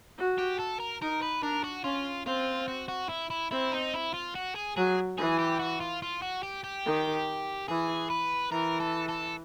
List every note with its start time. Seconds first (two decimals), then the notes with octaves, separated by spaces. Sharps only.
0.18 F#4
0.38 G4
0.60 A4
0.80 A#4
1.02 D#4 A#4
1.22 B4
1.42 D4 A#4
1.64 F#4
1.84 C#4 F4
2.26 C4 F4
2.68 F#4
2.88 F#4
3.09 E4
3.30 E4
3.51 C4 E4
3.72 D#4
3.94 E4
4.14 F4
4.35 F#4
4.55 G#4
4.76 F#3 G#4
5.18 E3 G#4
5.39 G4
5.60 F#4
5.80 F4
6.02 F4
6.22 F#4
6.43 G4
6.64 G4
6.86 D#3
7.68 E3 G#4
8.10 B4
8.52 E3 A#4
8.80 A4
9.08 A4